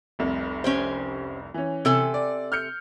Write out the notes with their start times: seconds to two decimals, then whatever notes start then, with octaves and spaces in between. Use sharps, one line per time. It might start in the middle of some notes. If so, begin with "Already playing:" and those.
0.19 F1 C2
0.64 C#4 G4 C5
1.54 E3 C#4
1.85 C3 A4 G#5
2.14 D5
2.52 F6 G6 C#7